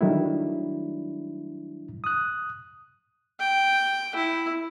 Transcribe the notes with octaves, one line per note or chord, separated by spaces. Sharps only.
D#3 F#3 G3 A3 D4 E4
D#6 F#6
G5
E4